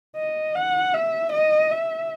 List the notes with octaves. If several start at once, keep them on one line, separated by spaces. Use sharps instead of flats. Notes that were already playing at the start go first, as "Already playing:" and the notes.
D#5
F#5
E5
D#5
E5